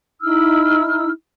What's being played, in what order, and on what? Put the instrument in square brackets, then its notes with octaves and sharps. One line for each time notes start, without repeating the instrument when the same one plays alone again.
[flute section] D#4 E4 E6 F6